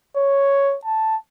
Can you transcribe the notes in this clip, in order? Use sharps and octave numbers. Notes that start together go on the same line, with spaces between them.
C#5
A5